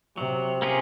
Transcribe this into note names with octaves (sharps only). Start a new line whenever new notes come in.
C3 F#3
A#3 C#4 F4 G#4